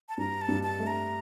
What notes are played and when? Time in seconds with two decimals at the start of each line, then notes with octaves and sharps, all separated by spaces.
0.09 A5
0.18 G2 A#5
0.41 A5
0.49 G2
0.63 A5
0.79 A3
0.87 A#5